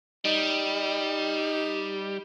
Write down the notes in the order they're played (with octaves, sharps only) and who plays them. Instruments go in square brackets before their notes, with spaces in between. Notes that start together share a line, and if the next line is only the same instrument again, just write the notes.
[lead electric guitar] G3 [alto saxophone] D#4